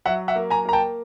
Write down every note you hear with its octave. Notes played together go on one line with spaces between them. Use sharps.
F#3 E5 F#5
E5 F#5
A#3
G#5 A#5
A#3 A#5
G5 A5